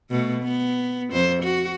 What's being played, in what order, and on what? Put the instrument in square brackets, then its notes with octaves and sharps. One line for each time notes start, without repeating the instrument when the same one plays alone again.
[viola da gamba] B2 A3
B3
F2 C5
F#4